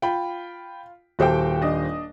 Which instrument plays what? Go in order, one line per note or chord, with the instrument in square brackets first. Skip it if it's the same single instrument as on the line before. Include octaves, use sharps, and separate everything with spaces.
[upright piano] F4 [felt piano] G5 B5
[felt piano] D#1 G4 C5 [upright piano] F#4 A4 G5
[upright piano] D4 D#5